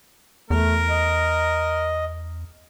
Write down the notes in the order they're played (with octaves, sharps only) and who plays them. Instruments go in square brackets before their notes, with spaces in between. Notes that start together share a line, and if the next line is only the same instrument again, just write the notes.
[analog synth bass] E2 [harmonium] A3 [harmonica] A#4
[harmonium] D#5